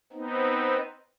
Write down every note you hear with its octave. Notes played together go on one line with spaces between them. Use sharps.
B3 C4 D#4